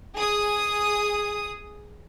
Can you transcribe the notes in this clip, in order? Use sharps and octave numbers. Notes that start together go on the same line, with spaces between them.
G#4 D#6